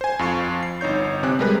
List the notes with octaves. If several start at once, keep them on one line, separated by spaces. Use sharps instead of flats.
C5 G#5
F2 F4 C#6 C7
C7
G1 D#4 C#5 G6
C3 C4 G#5 D6 F#6
G3 G#3 A#4 B4